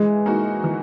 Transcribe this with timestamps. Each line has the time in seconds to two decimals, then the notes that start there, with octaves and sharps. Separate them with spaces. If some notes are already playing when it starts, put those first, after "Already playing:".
Already playing: E3 G#3
0.26 A#3 D#4 F#4
0.64 E3